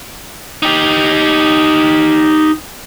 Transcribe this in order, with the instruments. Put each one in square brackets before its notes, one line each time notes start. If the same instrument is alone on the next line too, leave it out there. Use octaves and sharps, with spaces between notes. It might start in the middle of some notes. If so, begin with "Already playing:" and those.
[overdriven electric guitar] D#4 G4